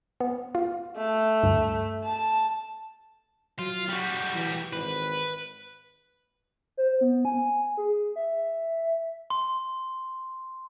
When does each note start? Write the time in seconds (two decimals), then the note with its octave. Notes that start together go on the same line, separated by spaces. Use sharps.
0.20 B3
0.55 F4
0.97 A3
1.43 D2 G2
2.05 A5
3.59 F#3 F4
3.89 G3 F#4
4.34 E3
4.73 G#1 B4
6.77 C5
7.01 B3
7.25 G#5
7.77 G#4
8.16 E5
9.30 C6